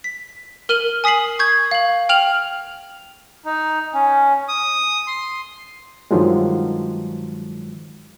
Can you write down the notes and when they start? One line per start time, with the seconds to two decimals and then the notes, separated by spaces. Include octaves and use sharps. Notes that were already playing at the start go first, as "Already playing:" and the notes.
0.04 B6
0.69 A#4 F6 D#7 F#7 G7
1.04 G#5 D#6 B6 C7 F#7
1.39 C#6 G6 G#6
1.71 F5 F#7
2.09 G5 F6 F7 F#7
3.45 D#4
3.94 C#4
4.48 D#6
5.07 C6
6.11 G2 D#3 F3 F#3 G#3